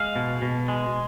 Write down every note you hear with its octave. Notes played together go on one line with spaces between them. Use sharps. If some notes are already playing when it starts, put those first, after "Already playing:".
Already playing: G#3 F5
B2
B2
G#3